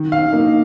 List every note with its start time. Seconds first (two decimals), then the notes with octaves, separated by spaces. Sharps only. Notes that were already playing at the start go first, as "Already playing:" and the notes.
Already playing: D#3
0.12 F5
0.33 A#3 D#4